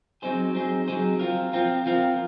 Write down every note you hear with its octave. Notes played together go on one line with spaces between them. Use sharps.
F#3 C4 D#4 G#4 C5
F#3 C4 D#4 G#4 C5
F#3 C4 D#4 G#4 C5
F3 C4 F4 A#4
F3 C4 F4 A#4
F3 C4 F4 A#4